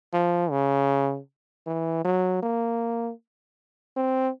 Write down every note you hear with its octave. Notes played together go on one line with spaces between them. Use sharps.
F3
C#3
E3
F#3
A#3
C4